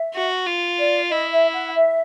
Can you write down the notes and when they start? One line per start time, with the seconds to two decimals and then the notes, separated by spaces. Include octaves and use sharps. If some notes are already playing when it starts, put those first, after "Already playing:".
Already playing: E5
0.14 F#4
0.46 F4
0.78 D5
1.11 E4 D#5
1.33 E5
1.54 F#5
1.75 E5